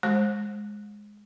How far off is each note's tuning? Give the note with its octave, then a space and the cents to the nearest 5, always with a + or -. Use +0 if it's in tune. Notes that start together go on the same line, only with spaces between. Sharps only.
G#3 +0 C5 +30